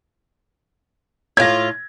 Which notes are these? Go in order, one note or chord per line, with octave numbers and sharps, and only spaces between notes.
A2 F4 G#6 A#6